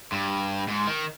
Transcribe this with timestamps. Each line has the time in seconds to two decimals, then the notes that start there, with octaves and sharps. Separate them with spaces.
0.12 G2
0.68 G#2
0.87 D#3